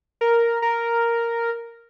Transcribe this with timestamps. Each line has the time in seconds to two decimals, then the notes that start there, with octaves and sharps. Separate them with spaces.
0.21 A#4
0.62 A#4